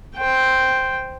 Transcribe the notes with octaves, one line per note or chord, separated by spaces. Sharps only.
C5 G5